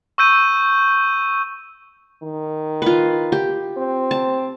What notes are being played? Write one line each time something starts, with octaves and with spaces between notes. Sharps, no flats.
C#6 E6 G6 D#7
D#3
F4 B4
G4
C4
A5